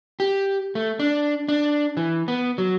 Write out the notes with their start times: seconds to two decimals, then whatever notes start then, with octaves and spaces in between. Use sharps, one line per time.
0.20 G4
0.75 A3
0.99 D4
1.48 D4
1.97 E3
2.28 B3
2.58 F#3